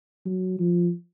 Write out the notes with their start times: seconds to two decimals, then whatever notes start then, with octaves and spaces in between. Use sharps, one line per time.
0.26 F#3
0.59 F3